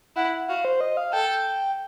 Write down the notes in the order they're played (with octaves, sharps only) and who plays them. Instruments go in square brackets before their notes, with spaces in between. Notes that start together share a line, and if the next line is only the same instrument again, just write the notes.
[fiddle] E4 [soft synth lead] F#5
[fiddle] F#4 [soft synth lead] F5
[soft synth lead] C5
D#5
F5
[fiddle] A4 [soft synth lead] G5